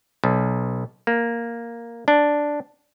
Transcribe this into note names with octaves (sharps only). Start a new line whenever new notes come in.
B1
A#3
D4